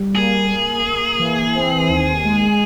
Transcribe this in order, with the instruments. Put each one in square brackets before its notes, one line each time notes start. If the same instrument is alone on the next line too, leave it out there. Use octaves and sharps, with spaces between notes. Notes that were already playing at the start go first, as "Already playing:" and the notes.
Already playing: [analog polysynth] G3
[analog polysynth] A#3 [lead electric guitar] G#4
[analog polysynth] A#3
A#3
E3
C4
D#2
G#3